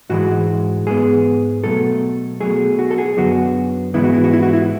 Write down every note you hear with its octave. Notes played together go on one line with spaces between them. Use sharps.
G#2 E3 G#3 F#4
G#2 G#3 B3 G#4
B2 F#3 A3 A4
B2 F#3 A3 G#4
F#4
A4
G#4
F#2 D3 F#3 B3 F#4
G#2 E3 G#3 B3 E4
F#4
E4
F#4
E4
F#4
E4